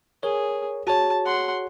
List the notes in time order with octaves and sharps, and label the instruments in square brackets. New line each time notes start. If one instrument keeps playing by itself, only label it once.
[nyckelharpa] G#4 [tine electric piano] A#4 C#5
[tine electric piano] F#4 G#4 C#5 [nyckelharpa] A5
[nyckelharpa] F#5 C6